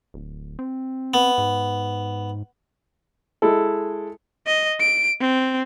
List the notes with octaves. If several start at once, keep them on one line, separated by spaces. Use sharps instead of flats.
D1
C4
B3
G#2
G#3 E4 A4
D#5
D7
C4